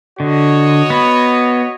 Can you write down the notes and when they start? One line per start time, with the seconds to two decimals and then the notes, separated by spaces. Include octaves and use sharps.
0.20 D3 F#4 C#5 D#5
0.90 B3 B5